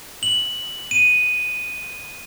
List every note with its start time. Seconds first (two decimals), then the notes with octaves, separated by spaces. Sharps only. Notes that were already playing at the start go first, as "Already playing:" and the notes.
0.23 F#7
0.91 D#7